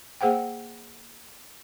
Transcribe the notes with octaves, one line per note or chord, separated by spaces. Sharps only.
A#3 G#4 C5 F#5 G5